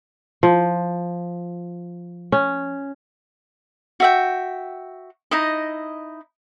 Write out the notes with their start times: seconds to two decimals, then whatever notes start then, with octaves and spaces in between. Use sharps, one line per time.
0.43 F3
2.32 C#4
4.00 F#4 E5 G5
5.31 D#4 E4 D#5